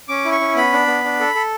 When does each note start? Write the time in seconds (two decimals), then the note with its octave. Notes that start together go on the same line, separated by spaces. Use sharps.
0.08 C#4 D6
0.25 E4
0.32 C#6
0.41 C#4
0.56 B3 B5
0.73 D4
0.87 B3
1.04 D4
1.20 A4
1.35 A4